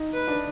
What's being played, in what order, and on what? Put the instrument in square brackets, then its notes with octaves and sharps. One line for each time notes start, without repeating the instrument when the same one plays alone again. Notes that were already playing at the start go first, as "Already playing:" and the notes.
Already playing: [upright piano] D#4
[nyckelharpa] B4
[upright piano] D4